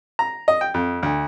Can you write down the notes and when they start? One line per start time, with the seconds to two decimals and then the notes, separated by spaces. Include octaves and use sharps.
0.19 A#5
0.48 D#5
0.61 G5
0.74 F2
1.03 D2